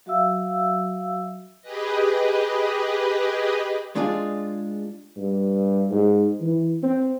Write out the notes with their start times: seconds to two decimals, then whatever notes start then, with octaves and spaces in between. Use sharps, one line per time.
0.06 F#3 F#4 E5 F5 E6
1.62 G4 G#4 B4 D#5
3.95 G#3 D4 F4 G#4
5.17 G2
5.91 G#2
6.41 E3
6.83 C4